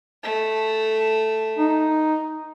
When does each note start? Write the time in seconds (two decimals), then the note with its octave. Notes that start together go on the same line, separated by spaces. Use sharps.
0.23 A3
1.59 D#4